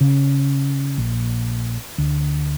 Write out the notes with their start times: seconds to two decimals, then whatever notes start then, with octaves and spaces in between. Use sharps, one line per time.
0.01 C#3
0.98 A#1
1.98 D2